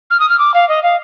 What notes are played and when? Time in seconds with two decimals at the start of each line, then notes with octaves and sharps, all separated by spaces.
0.11 F6
0.20 D#6
0.30 F6
0.39 D6
0.54 F5
0.69 D#5
0.83 F5